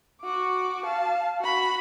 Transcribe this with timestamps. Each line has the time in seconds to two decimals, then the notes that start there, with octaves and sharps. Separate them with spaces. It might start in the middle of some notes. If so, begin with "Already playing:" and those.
0.22 F#4 D6
0.84 F5 A5
1.39 F#4 B5